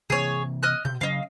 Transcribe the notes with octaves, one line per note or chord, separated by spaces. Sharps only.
C3 E3 A#3 G#4 C#5
D#5 F6 F#6
B2 G6
C#3 F#3 C#4 D#5 F5